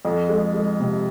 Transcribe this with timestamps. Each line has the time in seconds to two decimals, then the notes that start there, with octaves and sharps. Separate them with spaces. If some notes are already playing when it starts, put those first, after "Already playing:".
0.05 F2
0.29 G#3
0.54 G#3
0.80 C3